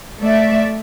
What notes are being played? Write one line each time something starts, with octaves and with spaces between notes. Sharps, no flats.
A3 D5 E5